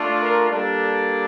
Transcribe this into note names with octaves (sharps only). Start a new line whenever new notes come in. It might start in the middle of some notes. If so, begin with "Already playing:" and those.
Already playing: A3 D4 F4
A#4
G3 A#3 D4 A4